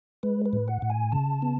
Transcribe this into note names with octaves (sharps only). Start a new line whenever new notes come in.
G#3 B4
B4
A2
F#5
A2
G#5
C#3 A5
B3